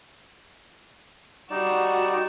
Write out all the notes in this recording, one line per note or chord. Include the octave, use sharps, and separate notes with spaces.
G3 D#4 F#4 D5 E7